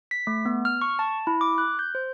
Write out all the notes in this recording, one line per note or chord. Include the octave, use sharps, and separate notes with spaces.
B6
A3
B3
F6
C#6
A5
E4
D6
F#6
G6
C5